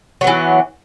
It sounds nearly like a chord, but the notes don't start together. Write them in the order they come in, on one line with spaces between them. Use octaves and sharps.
F#3 B3 E3